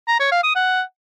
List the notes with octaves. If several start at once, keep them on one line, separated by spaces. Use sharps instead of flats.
A#5
C#5
F5
D#6
F#5